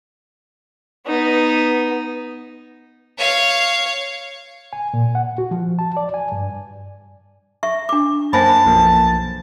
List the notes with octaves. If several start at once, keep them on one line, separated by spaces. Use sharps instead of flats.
B3 D#4
C#5 F5
G#5
A#2
F#5
F#4
F3
A5
D5
G#5
G2
E5 C#6
D4 D6
F#2 A#3 C5 G#5 A5 B5 A#6
B1 F3 A#3